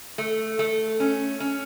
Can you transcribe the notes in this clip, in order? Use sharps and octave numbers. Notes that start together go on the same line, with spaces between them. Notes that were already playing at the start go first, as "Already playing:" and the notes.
A3
A3
C#4
C#4